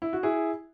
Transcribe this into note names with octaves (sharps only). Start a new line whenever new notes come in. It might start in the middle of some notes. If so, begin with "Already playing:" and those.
E4
F#4
E4 G#4